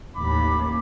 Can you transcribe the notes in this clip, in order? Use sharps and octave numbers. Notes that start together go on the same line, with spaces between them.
A1 D#2 B5 D6